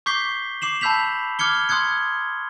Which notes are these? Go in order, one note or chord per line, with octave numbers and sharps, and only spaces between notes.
C#6 D6 G6 B6 C7 G7
D6 C7 E7 F#7
A5 B5 E6 G6 B6 F7
D6 F6 G#6 C#7 G7
C6 D#6 F#6 G#6 C#7